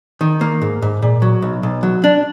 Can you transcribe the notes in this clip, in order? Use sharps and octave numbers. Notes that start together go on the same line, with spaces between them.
D#3
A#3
G#2
G#2
A#2
F#3
B1
B1
F#3
D4